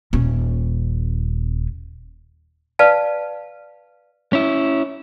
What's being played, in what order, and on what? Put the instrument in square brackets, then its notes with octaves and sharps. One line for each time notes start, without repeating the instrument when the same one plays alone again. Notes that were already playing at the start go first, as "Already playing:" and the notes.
[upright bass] D#1 C#4
[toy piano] B4 D5 F5 A5
[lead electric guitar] C#4 E4